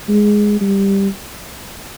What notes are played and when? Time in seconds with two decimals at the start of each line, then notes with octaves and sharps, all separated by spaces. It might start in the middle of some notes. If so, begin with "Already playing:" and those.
0.08 G#3
0.61 G3